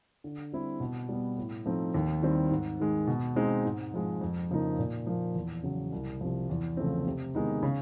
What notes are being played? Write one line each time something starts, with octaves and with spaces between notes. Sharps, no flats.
D3
G3 C4 E4
B2
G3 B3
A2
F3 A3 C4 D#4
D#2
D#3 G3 C4 E4
G#2
D#3 G#3
B2
G#3 C4 D#4
G#2
F3 G#3
F2
C#3 F3 A#3 D#4
A#2
F3 A#3
E2
C#3 F#3
C2
C3 F3
E2
C#3 F3 A3 C4
C3
D#3 G#3 B3 D#4
C#3